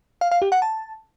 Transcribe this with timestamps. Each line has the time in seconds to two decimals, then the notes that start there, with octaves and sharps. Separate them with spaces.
0.21 F5
0.31 F5
0.42 G4
0.52 F#5
0.62 A5